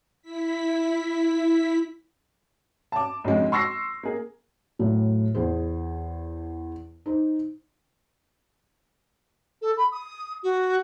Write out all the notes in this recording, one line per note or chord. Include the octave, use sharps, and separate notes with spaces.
E4 B6
A5 D6
B1 F2 D3 G#3
C6 C#6 E6 A#6 C7
A#3 G#4
A2 F#3
E2 G#4 C5
D#4 C5
A4
B5
D#6
F#4